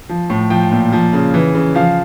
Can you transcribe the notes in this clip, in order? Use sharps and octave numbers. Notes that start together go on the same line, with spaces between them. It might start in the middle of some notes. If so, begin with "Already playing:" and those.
F3
A2
F3 G5
A#2
F3
C#3
E3
C#3
F3 F5